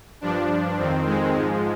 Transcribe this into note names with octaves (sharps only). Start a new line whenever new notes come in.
G2 F3 D4
F2 D#3 C4
G#3
G#2 F3 G#3